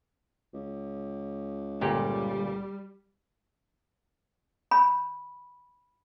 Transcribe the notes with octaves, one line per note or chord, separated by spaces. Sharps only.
C#2
G1 A#2 G3 G4
B5